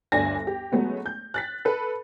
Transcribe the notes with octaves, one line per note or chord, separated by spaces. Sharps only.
G1 D2 G2 D4 G#5 A#6
G4
F#3 G#3 A3 B3 C#4
G6
F#6 A6 B6
A4 B4